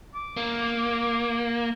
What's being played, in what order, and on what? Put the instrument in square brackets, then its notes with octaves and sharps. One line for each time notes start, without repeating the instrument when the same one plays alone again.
[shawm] D6
[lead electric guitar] A#3